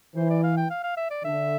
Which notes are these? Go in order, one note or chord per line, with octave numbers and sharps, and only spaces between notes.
E3 C5
D5
F5
G5
F5
F5
E5
D5
D3 E5